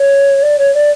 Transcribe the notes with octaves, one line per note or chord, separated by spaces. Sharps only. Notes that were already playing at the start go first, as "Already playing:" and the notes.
Already playing: C#5
D5
C#5
D5